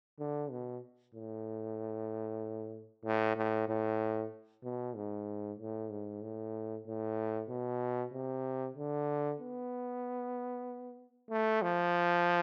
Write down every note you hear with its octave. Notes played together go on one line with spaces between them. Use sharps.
D3
B2
A2
A2
A2
A2
B2
G#2
A2
G#2
A2
A2
B2
C3
D3
B3
A3
F3